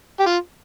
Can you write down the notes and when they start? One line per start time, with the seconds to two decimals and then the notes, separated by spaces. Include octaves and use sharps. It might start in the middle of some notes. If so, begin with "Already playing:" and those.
0.20 G4
0.26 F4